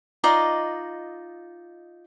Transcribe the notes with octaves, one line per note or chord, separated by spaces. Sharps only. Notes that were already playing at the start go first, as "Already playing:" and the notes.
D#4 F4 D5 D#5